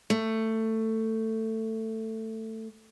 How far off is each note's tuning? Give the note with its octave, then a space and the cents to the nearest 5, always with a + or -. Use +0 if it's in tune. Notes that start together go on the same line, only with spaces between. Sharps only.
A3 +15